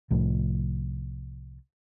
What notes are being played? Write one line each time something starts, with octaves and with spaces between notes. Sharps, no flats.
C2 A2 F3